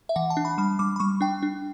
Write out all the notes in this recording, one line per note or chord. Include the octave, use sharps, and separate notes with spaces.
E5
E3 F#5
A5
D4
B5
G3 B5
G3 D6
B5
G3 C#6
D4 G5
D4